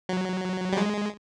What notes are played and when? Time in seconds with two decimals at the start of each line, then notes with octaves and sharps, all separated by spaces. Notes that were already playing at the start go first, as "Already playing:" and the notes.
0.09 F#3
0.73 G3
0.78 G#3